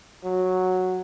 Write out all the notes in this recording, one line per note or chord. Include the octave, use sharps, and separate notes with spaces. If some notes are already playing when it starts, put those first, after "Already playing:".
F#3